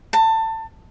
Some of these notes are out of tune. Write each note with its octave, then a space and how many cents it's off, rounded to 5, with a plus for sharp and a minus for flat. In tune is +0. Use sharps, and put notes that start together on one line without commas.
A5 +25